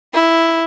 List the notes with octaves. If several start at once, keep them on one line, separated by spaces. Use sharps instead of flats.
E4